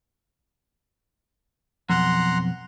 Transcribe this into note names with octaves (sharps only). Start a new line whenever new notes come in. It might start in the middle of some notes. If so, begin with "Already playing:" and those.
B1 F2 F#5 A#5 C6